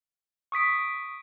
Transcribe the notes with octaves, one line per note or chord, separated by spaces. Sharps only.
C#6 D#6 B6 D7